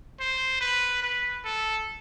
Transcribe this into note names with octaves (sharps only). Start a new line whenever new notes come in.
C5
B4
B4
A4